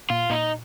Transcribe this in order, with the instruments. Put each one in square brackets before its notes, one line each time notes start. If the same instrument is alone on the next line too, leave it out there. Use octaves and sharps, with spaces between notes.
[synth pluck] A#2 [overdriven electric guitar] F4
[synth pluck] A#2 [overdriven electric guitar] D#4